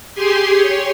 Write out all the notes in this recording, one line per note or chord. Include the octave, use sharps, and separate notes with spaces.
G4 G#4 G#5 C6
C#5